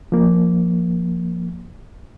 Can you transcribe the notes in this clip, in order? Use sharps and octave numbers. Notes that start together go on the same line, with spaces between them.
F3 A#3